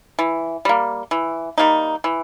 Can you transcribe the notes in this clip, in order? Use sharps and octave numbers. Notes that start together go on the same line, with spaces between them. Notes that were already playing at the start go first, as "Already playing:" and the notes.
E3
G3 A#3
E3
G3 A#3 D#4
E3